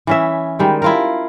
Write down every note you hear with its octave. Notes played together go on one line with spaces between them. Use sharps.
E3 C#4 E5
D#3 G3 G#3
E4 F4 A#4